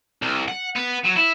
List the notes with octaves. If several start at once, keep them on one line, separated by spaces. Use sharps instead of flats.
C2
F#5
B3
F#3
E4